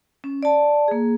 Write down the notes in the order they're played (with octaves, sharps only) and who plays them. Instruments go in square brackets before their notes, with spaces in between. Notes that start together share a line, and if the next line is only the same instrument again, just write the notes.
[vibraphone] C#4
D5 A5
A#3 G#4